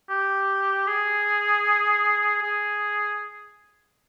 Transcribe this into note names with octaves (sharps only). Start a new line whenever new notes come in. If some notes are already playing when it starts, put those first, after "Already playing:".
G4
G#4
G#4